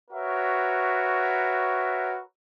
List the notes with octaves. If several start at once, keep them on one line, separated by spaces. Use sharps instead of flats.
F#4 A#4 B4 C#5 E5